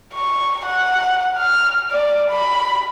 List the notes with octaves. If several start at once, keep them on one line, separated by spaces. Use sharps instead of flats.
C#6
F#5
F6
D5
B5